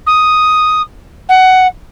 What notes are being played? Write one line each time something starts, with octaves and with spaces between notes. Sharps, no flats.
D#6
F#5